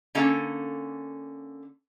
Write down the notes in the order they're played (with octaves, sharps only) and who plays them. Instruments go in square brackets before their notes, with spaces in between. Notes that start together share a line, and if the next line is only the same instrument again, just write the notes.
[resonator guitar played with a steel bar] D3 A#3 C#4 A4